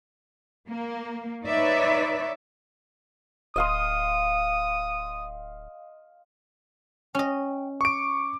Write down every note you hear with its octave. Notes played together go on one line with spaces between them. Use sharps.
A#3
D#4 B4 C#5 D5 E5
D1 D#5 F5 C6 D#6
C#4 D#5 G5
C#6 D6 D7